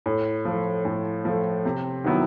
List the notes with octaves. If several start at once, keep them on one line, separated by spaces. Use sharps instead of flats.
A2
F3 A3
A2
F3 A3
C3
D#3 F#3 B3 E4